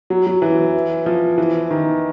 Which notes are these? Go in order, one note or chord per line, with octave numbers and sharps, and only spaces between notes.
F#3
F#3
E3
F3
E3
D#3